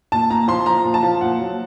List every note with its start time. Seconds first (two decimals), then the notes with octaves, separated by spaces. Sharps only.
0.12 A#2 A5
0.30 A#2 A#5
0.48 F3 C6
0.66 F3 A#5
0.85 A#2
0.94 A5
1.03 F3
1.21 A#2 F#5
1.39 F#3